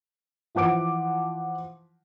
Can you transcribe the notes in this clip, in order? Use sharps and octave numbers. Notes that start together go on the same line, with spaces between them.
E3 F3 F#5 D6 D7